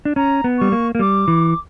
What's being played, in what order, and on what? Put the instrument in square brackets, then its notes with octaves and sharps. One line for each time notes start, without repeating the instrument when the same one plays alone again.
[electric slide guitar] D4
[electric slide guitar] C#4 [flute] A#5
[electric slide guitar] B3
[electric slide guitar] G3 [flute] C#6
[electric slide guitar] A#3
A#3
[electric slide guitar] G3 [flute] D6
[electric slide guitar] E3